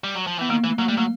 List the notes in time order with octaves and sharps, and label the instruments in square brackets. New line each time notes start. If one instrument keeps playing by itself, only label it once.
[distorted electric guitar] G3
F#3
F3
[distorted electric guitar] E3 [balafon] B3
[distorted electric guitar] D#3 [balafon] A#3
[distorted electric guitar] E3 [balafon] A3
[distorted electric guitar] F#3 [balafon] A#3
[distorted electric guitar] G3 [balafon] A3
[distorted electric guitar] F#3 [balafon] A#3